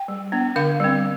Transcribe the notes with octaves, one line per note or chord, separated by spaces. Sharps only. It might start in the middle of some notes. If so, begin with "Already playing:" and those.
Already playing: G5
G3
B3 D4
D3 F5
G3 C4